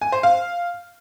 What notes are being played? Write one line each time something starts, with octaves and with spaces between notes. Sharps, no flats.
G#5
C5
F5